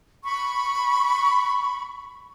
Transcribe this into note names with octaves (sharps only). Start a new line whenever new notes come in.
B5 C#6